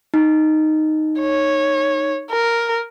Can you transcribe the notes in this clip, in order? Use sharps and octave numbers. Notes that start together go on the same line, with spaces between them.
D#4
C#5
A#4